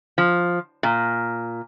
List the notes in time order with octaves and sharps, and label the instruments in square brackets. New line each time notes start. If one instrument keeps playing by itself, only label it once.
[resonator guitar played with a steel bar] F3
A#2